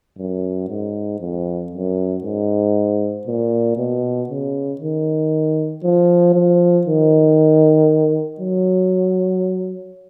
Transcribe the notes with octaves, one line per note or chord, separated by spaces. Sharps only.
F#2
G#2
F2
F#2
G#2
A#2
B2
C#3
D#3
F3
F3
D#3
F#3